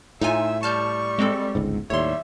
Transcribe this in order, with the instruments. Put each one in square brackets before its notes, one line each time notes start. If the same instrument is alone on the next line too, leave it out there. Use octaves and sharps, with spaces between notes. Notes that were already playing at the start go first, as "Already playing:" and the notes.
[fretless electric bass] A2 [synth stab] D#4 F4 G#5 [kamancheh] E5
[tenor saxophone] G3 [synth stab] A5 F6 G6 [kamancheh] C#6
[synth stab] G#3 C4 A4
[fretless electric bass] G1 C#2 G#2
[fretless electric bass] D#2 A2 [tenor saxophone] G3 [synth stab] C#5 C6 [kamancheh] E5